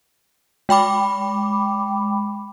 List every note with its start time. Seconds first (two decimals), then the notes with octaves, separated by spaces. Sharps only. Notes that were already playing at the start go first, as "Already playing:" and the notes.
0.69 G#3 G5 B5 D6